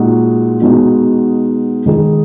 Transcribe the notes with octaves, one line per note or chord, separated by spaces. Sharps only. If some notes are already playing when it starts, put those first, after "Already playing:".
Already playing: A#2 G#3 D#4 F#4
B2 G#3 D#4 F#4
D#3 G#3 D#4 G#4